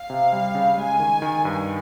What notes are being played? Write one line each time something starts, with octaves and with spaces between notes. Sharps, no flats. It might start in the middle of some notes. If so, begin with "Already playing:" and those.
Already playing: F5
C3
G3
C#3
G#3 G#5
D#3
D#3
G2